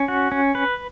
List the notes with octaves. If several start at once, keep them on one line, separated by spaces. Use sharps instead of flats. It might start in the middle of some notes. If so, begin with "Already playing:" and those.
Already playing: C#4
F#4
C#4
B4